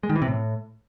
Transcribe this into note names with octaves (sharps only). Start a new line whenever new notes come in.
G#3
D#3
E3
C3
A2